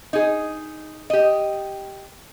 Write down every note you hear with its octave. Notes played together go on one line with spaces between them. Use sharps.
D#4 G#4
G4 D#5